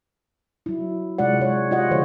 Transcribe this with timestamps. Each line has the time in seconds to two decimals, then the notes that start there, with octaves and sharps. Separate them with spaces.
0.66 F#3 E4
1.18 C3 G#3 F4 D5 F#5
1.40 G#3 C#5
1.71 F4 G4 D#5 F#5
1.91 D3 F3 G#4 C5 C#5